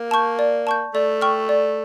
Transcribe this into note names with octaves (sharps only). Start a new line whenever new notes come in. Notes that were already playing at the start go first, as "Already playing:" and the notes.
Already playing: A#3
A5 C#6 G6
D5
A5 C#6 G6
A3 D5
G5 C#6 F6
D5